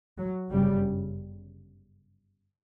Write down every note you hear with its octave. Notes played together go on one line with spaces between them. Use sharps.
F#3
G1 F#2 C#3 G3